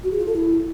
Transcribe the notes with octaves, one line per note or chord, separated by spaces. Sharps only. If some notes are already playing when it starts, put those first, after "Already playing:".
F#4
G#4
F4
A4
E4